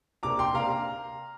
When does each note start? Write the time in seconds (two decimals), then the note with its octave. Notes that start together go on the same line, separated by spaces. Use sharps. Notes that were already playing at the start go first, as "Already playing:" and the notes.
0.23 C3 A#3 D4 A#5 D6
0.39 G5 C6
0.54 C3 A#3 D4 F5 A#5